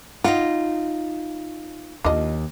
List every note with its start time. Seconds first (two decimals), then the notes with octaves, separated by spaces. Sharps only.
0.24 D#4 F4 F#5
2.04 D#2 D4 F4 D#5